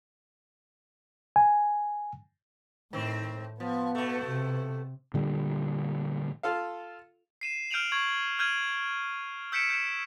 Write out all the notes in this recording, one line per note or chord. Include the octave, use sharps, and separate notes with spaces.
G#5
A2 D#3 C4
F3 B3
B2 A3
C3
A#2 D3 G3
F4 A4 F5
C7 D#7 E7
F6 G6 D7 D#7 F7 F#7
C#6 G#6 F#7
F6 G6 G#6 D#7 F#7
E6 G6 B6 C#7 D7 E7
G6 E7